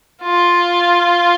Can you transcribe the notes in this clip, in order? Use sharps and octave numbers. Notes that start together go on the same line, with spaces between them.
F4